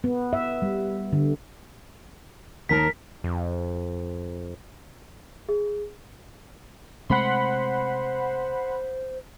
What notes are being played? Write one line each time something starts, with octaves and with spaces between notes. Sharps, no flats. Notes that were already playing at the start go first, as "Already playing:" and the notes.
B3
E5
G3
D3
D#2 D#4 A#4 A5 B6
F2
G#4
C3 G#3 A3 C5 F#5 B5 C6